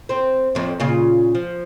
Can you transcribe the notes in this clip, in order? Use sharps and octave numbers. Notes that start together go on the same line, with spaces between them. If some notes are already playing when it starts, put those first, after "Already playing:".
C4 C5
F2 A2
A#2 C#3 F4
F3